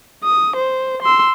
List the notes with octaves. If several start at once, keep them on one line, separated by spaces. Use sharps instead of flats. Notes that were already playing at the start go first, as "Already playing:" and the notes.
D#6
C5
C6 E6